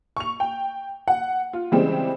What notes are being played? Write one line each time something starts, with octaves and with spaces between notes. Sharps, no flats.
C#6 F7
G5
F#5
F4
C#3 E3 G3 G#3 C4